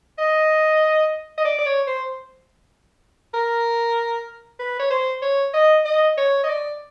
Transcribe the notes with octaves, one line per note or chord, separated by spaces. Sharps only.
D#5
D#5
D5
D5
C#5
C5
A#4
B4
C#5
C5
C#5
D#5
D#5
C#5
D#5
D5